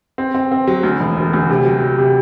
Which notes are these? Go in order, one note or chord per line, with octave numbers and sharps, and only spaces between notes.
C4
C4
C4
F#3
D2
E1
E1
D2
C3
F#3
F#3
C3